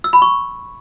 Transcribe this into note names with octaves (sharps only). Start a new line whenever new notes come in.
E6
B5
C#6